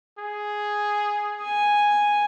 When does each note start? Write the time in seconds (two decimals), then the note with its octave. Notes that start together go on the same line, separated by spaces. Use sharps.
0.18 G#4
1.42 G#5